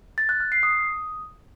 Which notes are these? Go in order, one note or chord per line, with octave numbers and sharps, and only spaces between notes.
A6
F#6
F6
C7
D#6